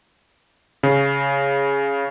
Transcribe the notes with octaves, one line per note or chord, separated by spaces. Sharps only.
C#3